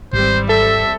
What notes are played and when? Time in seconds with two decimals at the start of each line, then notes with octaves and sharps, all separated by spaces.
0.13 G#1 E3 G3 C4 C5
0.49 A4 E5